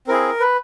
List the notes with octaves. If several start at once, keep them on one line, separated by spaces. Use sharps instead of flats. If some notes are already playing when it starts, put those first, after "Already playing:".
C4 E4 G#4 A#4
B4